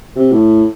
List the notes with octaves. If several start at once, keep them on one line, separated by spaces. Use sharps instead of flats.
C3
A2